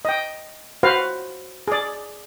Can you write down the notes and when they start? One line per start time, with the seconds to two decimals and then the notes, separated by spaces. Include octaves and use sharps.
0.05 D#5 G5
0.83 F#4 B4 C5 F5
1.68 G#4 D5